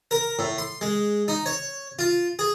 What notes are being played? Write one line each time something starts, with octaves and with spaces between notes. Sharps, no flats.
A#4
A2
C6
G#3
D#4
C#5
F4
G#4